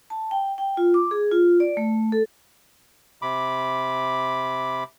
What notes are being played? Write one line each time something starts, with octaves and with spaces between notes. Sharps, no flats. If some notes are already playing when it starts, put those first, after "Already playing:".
A5
G5
G5
F4
D6
G#4
F4
D5
A3
A4
C3 B5 D6